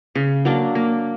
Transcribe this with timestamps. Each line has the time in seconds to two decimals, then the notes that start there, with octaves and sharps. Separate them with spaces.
0.15 C#3
0.45 F#3 A#3 D4
0.75 A#3